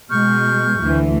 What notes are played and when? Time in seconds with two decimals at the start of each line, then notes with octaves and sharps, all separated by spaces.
0.10 B2 G#3 C#6 F6 G6
0.80 D2 E3